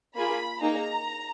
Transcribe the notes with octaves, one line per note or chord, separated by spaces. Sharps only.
A#3 F4 G#4 B5
A#3 D#4 G#4 A#5